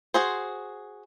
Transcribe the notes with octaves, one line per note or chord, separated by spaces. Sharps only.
F#4 G#4 C5